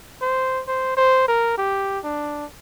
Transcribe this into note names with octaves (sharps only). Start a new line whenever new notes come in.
C5
C5
C5
A#4
G4
D4